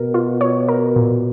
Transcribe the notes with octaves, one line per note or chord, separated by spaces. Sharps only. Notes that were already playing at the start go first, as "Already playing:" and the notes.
Already playing: B2 A#4
F4
C#5
A#4
A#2